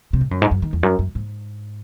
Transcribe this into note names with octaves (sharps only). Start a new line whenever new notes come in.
C3
A2
F#2
G#2
F#2
D#3
E2
F#2
F#2
G#2